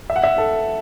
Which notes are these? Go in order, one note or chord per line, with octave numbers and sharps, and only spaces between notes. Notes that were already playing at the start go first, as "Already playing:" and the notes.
E5
F#5
E5
A4